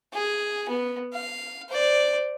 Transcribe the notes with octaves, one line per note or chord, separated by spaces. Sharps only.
G#4
B3
F5
C5 D5